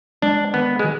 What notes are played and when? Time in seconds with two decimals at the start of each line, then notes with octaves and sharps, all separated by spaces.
0.22 G#3 D4
0.54 D#3 B3
0.79 G#3
0.84 D#3